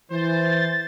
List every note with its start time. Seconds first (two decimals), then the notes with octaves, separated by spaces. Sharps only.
0.11 E3 C5 A6